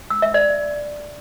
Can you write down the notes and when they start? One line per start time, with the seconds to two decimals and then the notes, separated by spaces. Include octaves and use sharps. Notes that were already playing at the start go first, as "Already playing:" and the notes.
0.10 E6
0.22 E5
0.34 D5